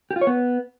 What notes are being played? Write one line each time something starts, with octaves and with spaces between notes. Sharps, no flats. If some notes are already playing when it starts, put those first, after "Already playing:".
G4
F4
C#5
B3